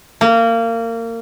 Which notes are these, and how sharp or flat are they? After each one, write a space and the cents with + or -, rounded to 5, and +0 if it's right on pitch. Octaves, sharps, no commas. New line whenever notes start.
A#3 -25